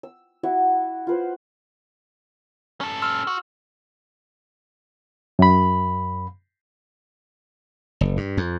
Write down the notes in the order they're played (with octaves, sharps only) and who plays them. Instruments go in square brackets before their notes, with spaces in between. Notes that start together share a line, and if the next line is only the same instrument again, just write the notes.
[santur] E6
E4 F#4 E5
F4 B4 C5
[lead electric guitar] C#4 A4
[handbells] C6 E6 F6
[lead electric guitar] F#4
[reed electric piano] F#2 B5
[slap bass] F#1
G2
F2